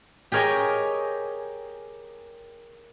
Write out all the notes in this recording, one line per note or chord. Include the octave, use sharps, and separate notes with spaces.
G4 G#4 A#4 C#5 D#5 G#5